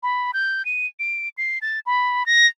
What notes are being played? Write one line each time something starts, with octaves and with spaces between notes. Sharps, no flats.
B5
G6
D#7
D7
C7
A6
B5
A#6